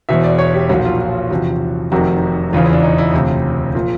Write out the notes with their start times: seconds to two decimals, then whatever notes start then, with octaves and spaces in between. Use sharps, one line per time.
0.09 E1 E2 B2 E5
0.24 D5
0.38 C#5
0.54 G4
0.69 B1 A#2 F3 F#4
0.85 F4
1.00 F4
1.30 E2 C3 F3 F#4
1.92 F1 F2 C3 D#3 F#4
2.52 E1 E2 C#3 E3 F4
2.62 E4
2.73 D4
2.83 D#4
2.98 E4
3.13 E1 D2 C3 F4
3.75 A#2 F3